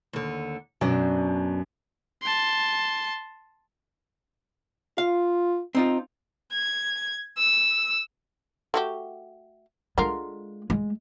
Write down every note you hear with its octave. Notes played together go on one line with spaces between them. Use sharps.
D#2 D3
F#2 B2 D4
A5 C6
F4 F5
C4 D#4 F4
G#6
E6
A3 F#4 G4
D3 G#3 F4 A#4
G#3